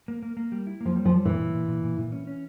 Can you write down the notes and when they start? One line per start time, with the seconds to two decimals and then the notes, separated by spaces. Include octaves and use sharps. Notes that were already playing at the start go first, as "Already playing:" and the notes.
0.08 A#3
0.23 A#3
0.37 A#3
0.52 G3
0.67 E4
0.81 F3 A#3
0.96 G3
1.05 F3
1.10 G3
1.25 A#2 E3
1.39 A#2
1.54 A#2
1.68 A#2
1.84 A#2
1.98 A#2
2.12 C#4
2.27 C#4